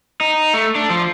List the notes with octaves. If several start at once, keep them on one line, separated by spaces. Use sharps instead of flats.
D#4
A3
D4
F3